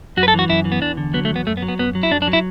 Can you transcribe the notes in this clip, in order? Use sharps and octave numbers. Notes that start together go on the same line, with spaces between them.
F#2 F#4
B4
A4
E3 F#4
F#2 E4
E3
B3
E2 D4
D3
F#3 B3
A3
E2
B3
F#2 A3
B3
F#3
B3
F#2 B3
F#3
E4
F#2 D4
D4
F#3
E4